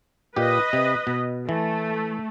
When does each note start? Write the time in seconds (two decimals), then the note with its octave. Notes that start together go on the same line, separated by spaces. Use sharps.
0.36 A#2 G4 B4 D#5
0.73 C3
1.07 B2
1.49 E3 A3